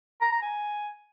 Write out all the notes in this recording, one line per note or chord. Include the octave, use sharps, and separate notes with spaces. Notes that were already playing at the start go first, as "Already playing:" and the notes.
A#5
A#5
G#5